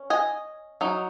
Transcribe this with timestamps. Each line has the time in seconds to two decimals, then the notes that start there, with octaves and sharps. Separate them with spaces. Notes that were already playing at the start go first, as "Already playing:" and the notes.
Already playing: C#4
0.10 D#5 G#5
0.81 F#3 D#4